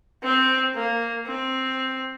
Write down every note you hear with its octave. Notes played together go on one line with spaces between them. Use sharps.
C4
A#3
C4